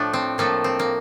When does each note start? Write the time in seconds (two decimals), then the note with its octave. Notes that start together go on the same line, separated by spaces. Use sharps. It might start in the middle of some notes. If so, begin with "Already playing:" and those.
Already playing: A2 F3 A3 D4
0.13 C4
0.38 A2 F3 A3 A#3
0.64 C4
0.79 A#3